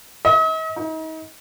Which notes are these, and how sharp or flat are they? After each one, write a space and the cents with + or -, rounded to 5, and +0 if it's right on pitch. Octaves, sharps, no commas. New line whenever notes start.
D#5 +45
D#4 +35